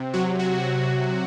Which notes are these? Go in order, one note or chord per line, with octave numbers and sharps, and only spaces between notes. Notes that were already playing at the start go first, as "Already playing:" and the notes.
Already playing: C3
F#3 F#4
F#3 F#4